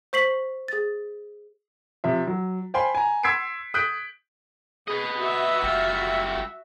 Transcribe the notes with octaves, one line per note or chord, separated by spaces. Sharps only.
C5 C#6 B6 C7 F#7
G#4 A6
C3 F3 E5
F#3
C5 F5 G5 G#5 B5 C6
G#5 A#5
C6 E6 G#6 B6 C7 D7
D#6 F#6 G6 B6 D7
G#4 B4 D#5
F#4 E5
F#1 G3 F4